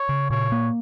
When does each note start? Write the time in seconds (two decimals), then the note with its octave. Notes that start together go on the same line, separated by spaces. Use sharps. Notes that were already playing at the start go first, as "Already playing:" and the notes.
Already playing: C#5
0.09 C#3
0.30 A#2 C#5
0.52 A#3